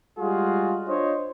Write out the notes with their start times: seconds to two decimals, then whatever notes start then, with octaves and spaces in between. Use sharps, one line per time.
0.19 G3 G#3 F4 F#4 G#4
0.87 D4 F4 C5 C#5 D#5